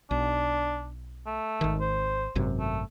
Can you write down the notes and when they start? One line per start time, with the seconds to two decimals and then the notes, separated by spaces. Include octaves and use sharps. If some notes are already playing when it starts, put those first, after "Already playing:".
0.11 B1 D4
1.26 A3
1.61 G#1 D#3
1.80 C5
2.35 G#1 F#2 C3
2.60 A3